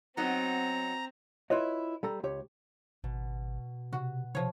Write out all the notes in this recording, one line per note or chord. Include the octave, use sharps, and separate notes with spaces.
F#3 B3 C4 D#4 A#5
E4 F4 B4 C#5 D#5
G3 A4 A#5
C#2 G4 C#5
G#1 B2
C3 F#4
C3 F3 C#5